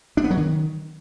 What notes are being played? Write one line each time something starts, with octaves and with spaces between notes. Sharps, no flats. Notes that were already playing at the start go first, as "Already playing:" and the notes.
D4
B3
F#3
D#3